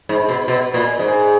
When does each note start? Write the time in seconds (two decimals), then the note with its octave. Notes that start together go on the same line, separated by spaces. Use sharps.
0.09 G#2
0.29 B2
0.48 B2
0.74 A#2
0.99 G#2